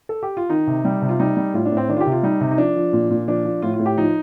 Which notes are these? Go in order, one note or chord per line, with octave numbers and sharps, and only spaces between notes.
A4
G4
F4
D#3 D#4
C3
G3
C3
F4
G3 D#4
G3
A2 F4
D4
A2 C4
D#3 D4
F4
G4
C3
F4
G3 D#4
C3
D#4
F3 D4
F3
A#2
A#2
F3 D4
F3
A2 F4
F4
A2
G4
F3 D#4